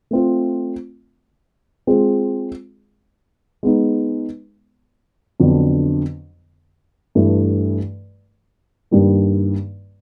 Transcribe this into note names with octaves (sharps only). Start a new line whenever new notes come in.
A3 C4 F4
G#3 C4 F4 G#4
G#3 B3 D#4
F2 D3 F#3 B3 D4
G2 E3 A3
G2 D#3 G3 A#3